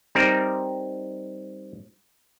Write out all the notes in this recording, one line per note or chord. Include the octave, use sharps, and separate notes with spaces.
G3 C4 D#4 A#4